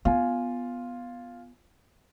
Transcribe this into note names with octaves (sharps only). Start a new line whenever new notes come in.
B3 F4 G#5